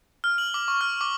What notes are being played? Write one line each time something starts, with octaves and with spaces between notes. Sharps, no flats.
F6
F#7
D6
C#6
F6
D6